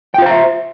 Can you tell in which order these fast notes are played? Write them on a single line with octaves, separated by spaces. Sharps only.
G5 F4 C5 A#5 E5